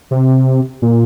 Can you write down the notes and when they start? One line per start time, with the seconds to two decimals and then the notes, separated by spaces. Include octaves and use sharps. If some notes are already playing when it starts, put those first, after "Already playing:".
0.11 C3
0.82 A#2